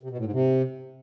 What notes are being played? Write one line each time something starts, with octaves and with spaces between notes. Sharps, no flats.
C3
B2
A2
G#2
C3